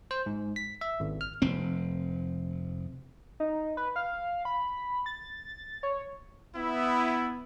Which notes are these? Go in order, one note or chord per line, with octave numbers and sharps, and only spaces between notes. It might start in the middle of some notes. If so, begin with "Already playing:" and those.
C5
G#2
B6
E5
G#1
F6
F1 C4
D#4
B4
F5
B5
A6
C#5
B3 E4